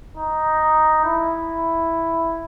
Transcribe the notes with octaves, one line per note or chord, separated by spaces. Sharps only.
D#4
E4